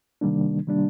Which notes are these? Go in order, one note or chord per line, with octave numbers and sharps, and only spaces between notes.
C3 D#3 G3 A#3 D4
C3 D#3 G3 A#3 D4